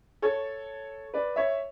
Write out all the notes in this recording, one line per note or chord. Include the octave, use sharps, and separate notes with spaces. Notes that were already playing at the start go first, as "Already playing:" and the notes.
A4 C#5
B4 D5
C#5 E5